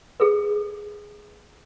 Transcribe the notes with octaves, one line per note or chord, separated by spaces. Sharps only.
G#4 A4 B4